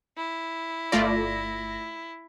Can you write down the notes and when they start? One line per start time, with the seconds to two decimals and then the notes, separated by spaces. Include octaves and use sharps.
0.17 E4
0.92 G1 A3 F4 D5 A#6